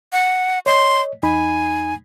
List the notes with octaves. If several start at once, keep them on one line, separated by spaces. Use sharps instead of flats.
F#5
C#5 D#5 C6
E2 D#4 G#5 B5